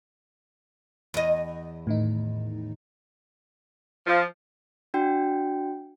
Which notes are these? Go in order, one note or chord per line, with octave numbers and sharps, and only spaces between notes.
E2 D#5
A2 D#3 D#4
F3
D4 F#4 G5